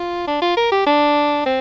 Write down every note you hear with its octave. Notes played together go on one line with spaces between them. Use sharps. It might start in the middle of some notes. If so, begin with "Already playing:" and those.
Already playing: F4
D4
F4
A#4
G4
D4
C4